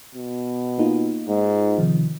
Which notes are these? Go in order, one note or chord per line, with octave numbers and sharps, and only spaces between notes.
B2
A#3 D#4 F4
G#2
C3 D#3 F3